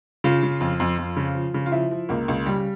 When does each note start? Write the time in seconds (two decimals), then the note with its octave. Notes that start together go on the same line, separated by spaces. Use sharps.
0.24 C#3 F4
0.43 C#3
0.60 F2
0.80 F2
0.98 F2
1.16 C#3
1.35 F3
1.54 C#3
1.66 F4
1.72 F3 E4
1.91 F3
2.09 C#2 A#3
2.28 C#2
2.46 C#3 G3